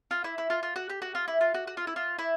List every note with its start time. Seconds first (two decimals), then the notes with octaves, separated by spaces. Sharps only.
0.11 F4
0.24 E4
0.38 E4
0.50 F4
0.63 F4
0.76 F#4
0.90 G4
1.02 F#4
1.15 F4
1.28 E4
1.41 F4
1.54 F#4
1.67 F#4
1.77 F4
1.87 E4
1.96 F4
2.19 E4